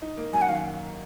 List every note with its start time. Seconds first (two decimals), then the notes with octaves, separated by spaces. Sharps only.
0.02 D#4
0.17 A#3
0.33 F#2 G#5
0.42 F#5
0.49 D#3 F5